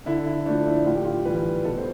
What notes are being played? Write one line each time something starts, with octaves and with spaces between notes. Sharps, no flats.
D3 E4
E4
F3 A3 D4
E4
A2 F4
G4
F4
E3 G3 B4
B2 A4
C5